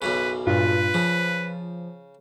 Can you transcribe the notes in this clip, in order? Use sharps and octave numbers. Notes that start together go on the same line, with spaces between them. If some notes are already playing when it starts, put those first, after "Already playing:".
B1 F#2 C#3 B4
G2 A#2 F4 B4
C#3 F3